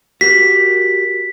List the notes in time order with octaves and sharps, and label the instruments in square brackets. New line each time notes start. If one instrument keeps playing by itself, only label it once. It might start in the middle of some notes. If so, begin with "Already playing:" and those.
[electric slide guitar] F#4 G4 A#4 [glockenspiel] B6